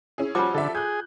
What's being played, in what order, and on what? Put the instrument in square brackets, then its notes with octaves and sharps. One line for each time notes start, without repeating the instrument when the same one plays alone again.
[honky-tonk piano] C#4 E4 G#4
[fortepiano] F3 G3 F#4 [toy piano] F4 D6
[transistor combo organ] D3 [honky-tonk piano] A4 D5 E5
[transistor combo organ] G#4 [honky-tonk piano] F#6 G6